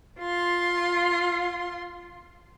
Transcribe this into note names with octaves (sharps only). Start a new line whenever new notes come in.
F4 C6